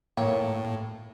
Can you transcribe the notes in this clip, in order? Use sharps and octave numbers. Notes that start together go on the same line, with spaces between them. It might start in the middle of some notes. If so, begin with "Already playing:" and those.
A2 A#3 C#5 G5